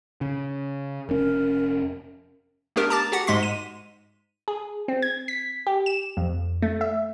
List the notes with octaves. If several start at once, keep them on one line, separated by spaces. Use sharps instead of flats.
C#3
F1 C#4 A#4
A3 B3 D4 G4 A#4
A5 A#5 D6 A6
F#4 G4 F#5
G#2 G#3 C6 B6
D#7
G#4
C4
G#6
B6
G4
E7
F2
A3
E5